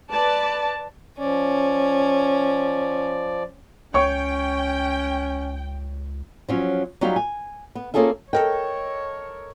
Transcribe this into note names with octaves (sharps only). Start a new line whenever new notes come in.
B4 D5 A5
F3 C#4 D5
C#2 C#4 C#5 G5 C#6
F3 F#3 C#4
F#3 G3 D#4 F4 G4
G#5
B3
A#3 C#4 F4 G#4 A4 E5
A4 A#4 C#5 D#5 G5